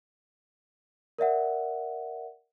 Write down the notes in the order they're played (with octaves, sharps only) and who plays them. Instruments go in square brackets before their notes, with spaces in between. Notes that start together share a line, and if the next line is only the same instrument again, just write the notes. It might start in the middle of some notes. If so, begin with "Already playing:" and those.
[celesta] A#4 D5 E5 F#5